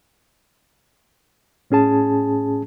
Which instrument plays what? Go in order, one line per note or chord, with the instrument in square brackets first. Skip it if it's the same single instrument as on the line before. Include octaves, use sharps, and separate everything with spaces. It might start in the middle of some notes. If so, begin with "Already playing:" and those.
[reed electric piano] A2 C#4 G#4 A5